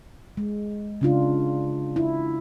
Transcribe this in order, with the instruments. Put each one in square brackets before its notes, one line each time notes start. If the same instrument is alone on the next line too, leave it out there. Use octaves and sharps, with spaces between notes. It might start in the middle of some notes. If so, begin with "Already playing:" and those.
[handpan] G#3
C#3 D4 F4
E4